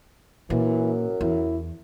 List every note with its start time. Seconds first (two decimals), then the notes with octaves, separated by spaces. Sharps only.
0.50 F#2 A#2 E3
1.21 E2 E4